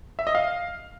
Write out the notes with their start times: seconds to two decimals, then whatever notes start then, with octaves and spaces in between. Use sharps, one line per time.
0.19 E5
0.27 D#5
0.35 F5